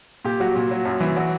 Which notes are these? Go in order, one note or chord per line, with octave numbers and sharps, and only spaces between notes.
A#2 G4
F#3 F#4
A#2
F#3
F#2
E3
F#3 F#4